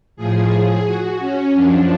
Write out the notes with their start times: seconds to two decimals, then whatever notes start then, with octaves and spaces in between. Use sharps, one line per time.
0.17 A2 F3 G#4
0.85 F#4
1.19 C#4
1.54 F#2 F3 D4